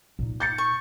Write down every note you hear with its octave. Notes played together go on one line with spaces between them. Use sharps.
A#2 D#4
G6 A6 C#7
C#6